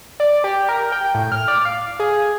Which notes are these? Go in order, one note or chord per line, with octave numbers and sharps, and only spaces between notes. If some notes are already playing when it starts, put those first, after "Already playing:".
D5
G4
A#4
G5
A2
F6
D5
F5
G#4